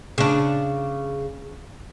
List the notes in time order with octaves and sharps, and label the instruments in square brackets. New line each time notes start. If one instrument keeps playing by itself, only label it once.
[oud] C#3 D4